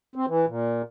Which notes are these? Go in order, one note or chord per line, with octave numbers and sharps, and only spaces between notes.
C4
E3
A#2